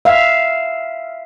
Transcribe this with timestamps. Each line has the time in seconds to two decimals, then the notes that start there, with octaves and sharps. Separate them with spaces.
0.05 E5 F5